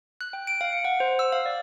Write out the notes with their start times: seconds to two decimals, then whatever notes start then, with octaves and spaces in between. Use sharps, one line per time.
0.21 F#6
0.33 G5
0.47 D7
0.61 F5
0.72 C#7
0.85 F#5
1.00 C5
1.19 E6
1.32 F5
1.46 D5